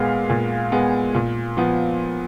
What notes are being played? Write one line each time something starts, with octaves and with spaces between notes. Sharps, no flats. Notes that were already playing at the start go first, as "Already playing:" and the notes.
Already playing: A#2 G#3 B3 F5
A#2
G#3 B3
A#2
F3 B3